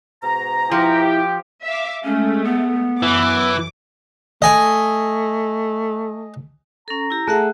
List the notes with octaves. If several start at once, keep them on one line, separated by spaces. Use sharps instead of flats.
G#2 B2 A#5
F3 E4 G4
E5 F5 D6
G#3 A3 C#4
B3
F#2 E3 D6
A3 D#5 G#5
C#4 A4 A#5
E4 G4
A3 G#4 A4 E5 F#5 A5 F#6